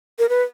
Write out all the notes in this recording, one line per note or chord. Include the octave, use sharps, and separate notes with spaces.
A#4
B4